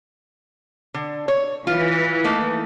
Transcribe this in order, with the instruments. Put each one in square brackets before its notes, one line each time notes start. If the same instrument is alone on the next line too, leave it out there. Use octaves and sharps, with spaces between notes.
[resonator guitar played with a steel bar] D3
C#5
[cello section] E3 [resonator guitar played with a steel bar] F4
[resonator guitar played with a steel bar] A3 A#3 D#4